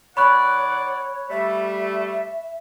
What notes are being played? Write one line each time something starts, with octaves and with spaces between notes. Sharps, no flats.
D#3 C#5 D5 F#5 B5 C#6 F#6
G3 A3 E5